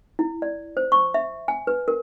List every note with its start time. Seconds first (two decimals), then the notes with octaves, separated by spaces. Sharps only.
0.19 E4
0.42 D5
0.77 C5
0.92 C#6
1.14 E5
1.48 G#5
1.67 B4
1.88 A#4